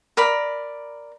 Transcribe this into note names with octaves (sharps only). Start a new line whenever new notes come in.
A#4 D5 B5